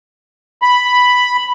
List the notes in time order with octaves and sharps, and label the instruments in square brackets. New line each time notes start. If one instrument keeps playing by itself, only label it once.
[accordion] B5